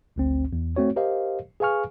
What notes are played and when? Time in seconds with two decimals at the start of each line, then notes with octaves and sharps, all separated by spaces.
0.16 G#1 D2 C4
0.53 E2
0.76 A3 C4 F#4 C#5
0.96 G4 A#4 C5 D#5 F5
1.60 G#4 B4 F5 G#5 C#6 F6